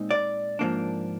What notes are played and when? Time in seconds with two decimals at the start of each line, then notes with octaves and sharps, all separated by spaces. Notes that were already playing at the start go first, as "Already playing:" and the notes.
Already playing: A#2 G#3 C4 D#4
0.11 D5
0.59 G#2 F3 A#3 D4